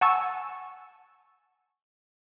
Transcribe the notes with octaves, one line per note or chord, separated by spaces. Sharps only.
F#5 G#5 A5 C#6 E6